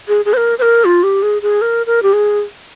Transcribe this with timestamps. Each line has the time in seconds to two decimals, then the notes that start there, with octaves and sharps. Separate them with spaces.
0.08 G#4
0.25 G#4
0.33 C5
0.37 A#4
0.59 C5
0.62 A#4
0.85 F4
1.03 G4
1.23 G#4
1.42 G#4
1.62 A#4
1.86 A#4
2.03 G4
2.13 G#4